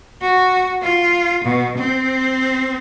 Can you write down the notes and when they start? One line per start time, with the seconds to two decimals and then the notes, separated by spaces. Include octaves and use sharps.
0.22 F#4
0.83 F4
1.44 B2
1.78 C4